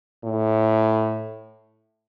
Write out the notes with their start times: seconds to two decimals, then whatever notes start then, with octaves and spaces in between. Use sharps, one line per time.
0.24 A2